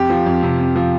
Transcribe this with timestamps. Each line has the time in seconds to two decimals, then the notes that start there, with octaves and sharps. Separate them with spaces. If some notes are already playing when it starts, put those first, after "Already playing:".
Already playing: F2 G4
0.10 F3
0.26 F2
0.43 C3
0.59 F2
0.76 F3